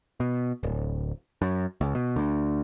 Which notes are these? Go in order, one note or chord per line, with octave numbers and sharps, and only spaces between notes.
B2
D1
F#2
C#2
B2
D2